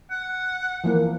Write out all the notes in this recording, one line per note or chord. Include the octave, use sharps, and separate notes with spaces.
F#5
E3 F3 A#3